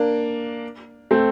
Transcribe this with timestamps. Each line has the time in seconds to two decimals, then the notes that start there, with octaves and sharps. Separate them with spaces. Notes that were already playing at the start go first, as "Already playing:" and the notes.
Already playing: A#3 D4
1.11 A3 C4